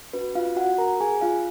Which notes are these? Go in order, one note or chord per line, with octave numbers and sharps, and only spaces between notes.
C#4 F#4 B4
F4 F5
F#4 F#5
A#4 A#5
G#4 G#5
F4 F5